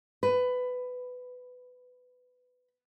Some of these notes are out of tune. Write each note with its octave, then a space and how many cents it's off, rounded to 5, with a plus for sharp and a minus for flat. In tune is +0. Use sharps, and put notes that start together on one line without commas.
B4 +15